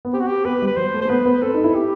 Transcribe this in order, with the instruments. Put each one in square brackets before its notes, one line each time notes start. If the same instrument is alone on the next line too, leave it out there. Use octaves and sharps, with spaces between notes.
[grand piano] B3
[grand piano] C4 [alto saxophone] G4
[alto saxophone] F#4
G4
[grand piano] B3 [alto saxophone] B4
[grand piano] G3
[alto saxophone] B4
[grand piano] F#3 [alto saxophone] C5
[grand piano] A3
[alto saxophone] C5
[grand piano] A3
[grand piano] B3 [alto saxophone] B4
[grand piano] B3
[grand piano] C4 [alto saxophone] A4
[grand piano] D#4
E4
[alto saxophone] G4